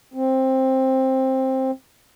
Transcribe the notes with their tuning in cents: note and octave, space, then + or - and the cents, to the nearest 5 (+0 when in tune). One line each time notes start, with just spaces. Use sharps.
C4 +10